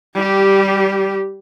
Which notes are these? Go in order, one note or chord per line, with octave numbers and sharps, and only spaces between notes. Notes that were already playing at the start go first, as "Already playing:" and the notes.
G3 G4